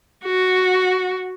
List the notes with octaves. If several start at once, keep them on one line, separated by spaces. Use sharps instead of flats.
F#4